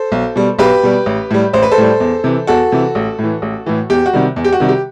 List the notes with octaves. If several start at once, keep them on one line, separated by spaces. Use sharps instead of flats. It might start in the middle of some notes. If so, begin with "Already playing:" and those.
Already playing: A4 C5
B1
B2 G3
B1 G4 B4
B2 G3
A1
A2 G3
A1 C5
B4
A4 C5
A2 G3
E2
C3 E3
E2 F#4 A4
C3 E3
A1
A2
E3
A1
A2 E3
E2 G4
F#4
C3 D#3 G3
E2
G4
F#4
C3 D#3 G3
G4